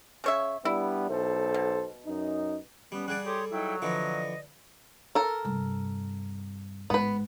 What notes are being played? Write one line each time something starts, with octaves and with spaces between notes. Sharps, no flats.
C#3 C#5 E5
G3 B3 D4 E4
B1 A4 C5
B2
F#2 D#4
G3 B3 C#4
G3 G#4 D5 F#5
G4 A4 C#5 C6 D#6
F#3 D#4 E4 G5
D3 E3 F3 D5 D#5
A4 A#4
G2 C3
A1 G#2 B3 B4